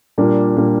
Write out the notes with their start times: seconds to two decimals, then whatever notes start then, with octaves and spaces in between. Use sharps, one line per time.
0.18 A#2 G3 A#3 D4
0.57 A#2 G3 A#3 D4